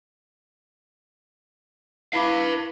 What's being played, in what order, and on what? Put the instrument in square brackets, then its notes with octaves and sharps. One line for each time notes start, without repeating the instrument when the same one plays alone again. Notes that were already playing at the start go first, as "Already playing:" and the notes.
[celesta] E4 B5 D6 [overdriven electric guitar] B4 F5